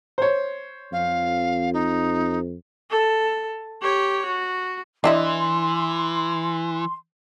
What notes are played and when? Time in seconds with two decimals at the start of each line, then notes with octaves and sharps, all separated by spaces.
0.18 C5 C#5
0.93 F2 F5
1.74 D#4
2.90 A4
3.82 G4 C#5
4.26 F#4
5.04 E3 D4 E4 D#5 C6